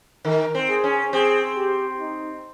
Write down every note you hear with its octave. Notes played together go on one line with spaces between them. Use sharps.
D#3 A#4
C4
G#4
C#4
C4 G#4
G4
D#4